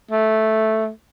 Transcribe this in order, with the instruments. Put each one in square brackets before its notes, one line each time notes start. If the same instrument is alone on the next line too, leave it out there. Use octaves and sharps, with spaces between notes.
[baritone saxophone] A3